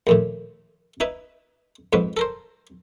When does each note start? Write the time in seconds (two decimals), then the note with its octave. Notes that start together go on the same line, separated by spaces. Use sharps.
0.07 A#1 D#2 A2
1.00 D#4 E4 B4
1.93 F2 G#2 B4
2.17 A4 A#4 C5